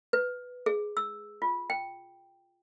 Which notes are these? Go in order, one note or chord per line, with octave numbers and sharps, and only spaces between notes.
B4
G#4
E6
F4
G5